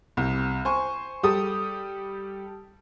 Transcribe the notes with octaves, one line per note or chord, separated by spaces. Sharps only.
C2
C5 G#5 C#6
G3 G4 A4 D#6